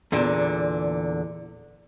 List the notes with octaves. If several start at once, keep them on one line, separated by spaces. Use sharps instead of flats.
E2 A#2 D3